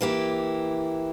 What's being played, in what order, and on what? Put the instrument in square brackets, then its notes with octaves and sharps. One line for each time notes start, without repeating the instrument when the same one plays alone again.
[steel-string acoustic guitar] E3 A#3 E4 G4